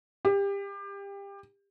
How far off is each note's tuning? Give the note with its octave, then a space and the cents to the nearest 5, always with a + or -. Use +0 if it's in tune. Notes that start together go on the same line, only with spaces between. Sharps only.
G4 +25